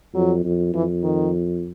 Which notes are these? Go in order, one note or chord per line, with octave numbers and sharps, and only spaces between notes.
F2 F#3
F2
F2 E3
D#3